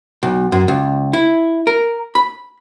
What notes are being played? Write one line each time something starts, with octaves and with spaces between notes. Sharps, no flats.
B1
F#2
C#2
E4
A#4
B5